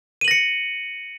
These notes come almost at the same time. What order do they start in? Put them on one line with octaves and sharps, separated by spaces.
D#7 F#7 A#6 C#7